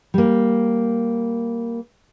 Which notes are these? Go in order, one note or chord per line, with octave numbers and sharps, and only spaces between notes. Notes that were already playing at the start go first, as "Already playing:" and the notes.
G3 A#3